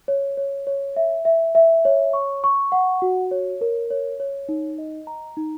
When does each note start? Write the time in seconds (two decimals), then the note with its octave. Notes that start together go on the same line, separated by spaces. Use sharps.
0.08 C#5
0.37 C#5
0.67 C#5
0.96 E5
1.25 E5
1.55 E5
1.85 C#5
2.13 C#6
2.44 C#6
2.72 F#5
3.02 F#4
3.31 C#5
3.61 A#4
3.91 C#5
4.20 C#5
4.49 D#4
4.78 D#5
5.07 A#5
5.37 D#4